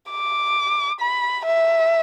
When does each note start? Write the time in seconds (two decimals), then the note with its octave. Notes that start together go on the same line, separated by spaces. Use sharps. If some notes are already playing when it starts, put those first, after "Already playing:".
0.11 D6
1.00 B5
1.46 E5